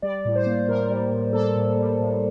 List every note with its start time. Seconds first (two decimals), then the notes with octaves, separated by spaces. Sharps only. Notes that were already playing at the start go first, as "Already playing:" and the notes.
0.02 G3 D5
0.25 A2
0.35 C5
0.46 A#3
0.68 A2 A#4
0.90 G3
1.11 A2
1.33 A#3 A4
1.56 A2
1.78 G3
1.99 A2